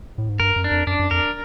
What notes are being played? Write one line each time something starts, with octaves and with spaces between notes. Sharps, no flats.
A2
G#2
G2 A#4
F#2
D4
F2
F#2 D4
F#2
F2 A#4